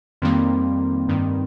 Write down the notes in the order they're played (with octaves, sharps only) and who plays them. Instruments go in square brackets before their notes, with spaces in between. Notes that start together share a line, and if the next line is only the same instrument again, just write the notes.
[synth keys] F2 D#3 G3 A#3 [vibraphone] C4
[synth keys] G2 D#3 G3